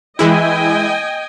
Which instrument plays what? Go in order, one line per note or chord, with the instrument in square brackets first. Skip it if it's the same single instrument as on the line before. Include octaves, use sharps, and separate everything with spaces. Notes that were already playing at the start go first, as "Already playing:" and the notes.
[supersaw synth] E3 G#3 E4 [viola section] D#5 G5 G#5